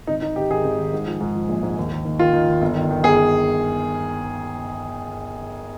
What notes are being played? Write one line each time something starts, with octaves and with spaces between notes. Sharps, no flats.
G#1 D#4
G#1 D#4
G#1 G4
G#1 G#4
G#1
D#3
G#2
F3
G#2
F3
A#1
G#2
D#2
D#3
D#2
D#3 F4
D#3
D#2
G1
D#3
D#3
G1 G#4
G1